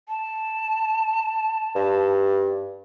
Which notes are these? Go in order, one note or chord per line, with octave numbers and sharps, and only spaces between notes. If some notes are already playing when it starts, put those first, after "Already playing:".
A5
G2